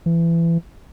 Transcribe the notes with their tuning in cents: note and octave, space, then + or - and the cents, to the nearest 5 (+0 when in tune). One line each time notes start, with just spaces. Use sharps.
E3 +25